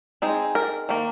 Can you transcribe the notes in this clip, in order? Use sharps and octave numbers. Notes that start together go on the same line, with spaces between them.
G#3 C4 D#4 G#4
A#4
D#3 A#3